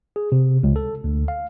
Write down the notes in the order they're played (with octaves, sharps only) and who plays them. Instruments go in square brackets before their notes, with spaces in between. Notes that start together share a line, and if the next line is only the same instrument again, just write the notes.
[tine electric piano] G#4
C3
C#2
A4
D2
F5